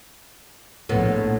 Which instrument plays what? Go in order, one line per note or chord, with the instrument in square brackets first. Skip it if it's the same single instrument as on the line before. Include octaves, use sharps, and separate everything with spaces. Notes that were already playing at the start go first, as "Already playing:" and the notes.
[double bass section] A#1 [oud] A2 B3